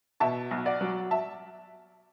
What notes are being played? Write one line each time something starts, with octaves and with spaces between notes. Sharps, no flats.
B2 E5 A5
B1
D5 F#5
F#3
E5 A5